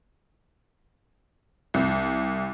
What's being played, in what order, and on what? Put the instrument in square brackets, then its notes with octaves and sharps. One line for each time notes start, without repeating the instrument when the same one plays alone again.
[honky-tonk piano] C2